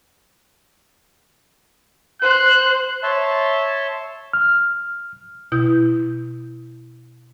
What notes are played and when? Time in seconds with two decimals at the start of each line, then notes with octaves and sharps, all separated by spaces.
2.22 C5 F#6
3.03 C#5 E5 A5 C6
4.33 F6
5.52 B2 E4 G6